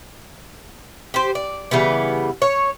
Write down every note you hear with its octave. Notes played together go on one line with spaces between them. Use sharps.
G4 C5
D5
C#3 E3 G3 B3
C#5